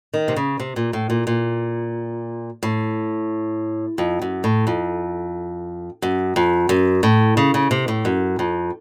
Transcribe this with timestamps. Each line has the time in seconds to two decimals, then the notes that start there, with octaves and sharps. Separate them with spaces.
0.14 D#3
0.28 C3
0.36 C#3
0.60 C3
0.76 A#2
0.93 A2
1.10 A#2
1.27 A#2
2.63 A2
3.98 F2
4.22 F#2
4.44 A2
4.67 F2
6.02 F#2
6.36 F2
6.69 F#2
7.03 A2
7.37 C#3
7.54 C#3
7.71 C3
7.88 A2
8.05 F#2
8.39 F2